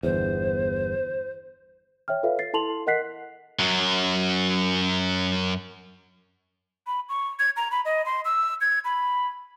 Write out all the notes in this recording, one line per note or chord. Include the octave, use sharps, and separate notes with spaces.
G1 E2 C5
C#5 E5 G5 F6
F4 A4 B4 C#5 E5 F5
A6 C7
E4 A4 A5 C6 F7 F#7
A#4 D#5 F#5 F#6 B6 C7
F#2 F#3
B5
C#6
G#6
A#5
B5
D#5
C6
E6
G#6
B5